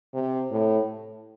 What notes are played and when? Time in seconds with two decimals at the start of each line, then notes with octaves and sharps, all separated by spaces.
0.14 C3
0.51 A2